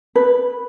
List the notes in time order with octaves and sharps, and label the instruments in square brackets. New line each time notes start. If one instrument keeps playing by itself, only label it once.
[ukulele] B4